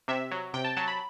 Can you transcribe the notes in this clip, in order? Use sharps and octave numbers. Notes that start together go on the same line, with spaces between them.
C3 E5
F#3
C3 G5
A5
F#3 A5
B5